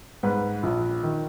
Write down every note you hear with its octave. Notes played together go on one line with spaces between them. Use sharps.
G#2 B4
A#1
D#3